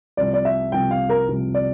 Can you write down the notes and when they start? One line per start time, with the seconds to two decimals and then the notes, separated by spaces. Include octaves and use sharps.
0.17 C2 C3 F3 D5
0.34 D5
0.45 E5
0.72 C2 C3 F3 G5
0.91 F5
1.09 A#4
1.28 C2 C3 F3
1.54 D5